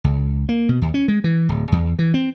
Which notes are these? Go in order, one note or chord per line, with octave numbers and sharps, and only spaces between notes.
C#2
A#3
B2
D#2
C#4
G#3
E3
D1
E2
E3
C4